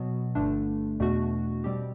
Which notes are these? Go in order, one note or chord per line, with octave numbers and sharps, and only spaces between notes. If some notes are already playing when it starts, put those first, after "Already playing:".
Already playing: B2 F#3 B3 F#4
G1 G2 D3 A3 D4
E2 B2 A3 D4 F#4
B2 G3 C4 G4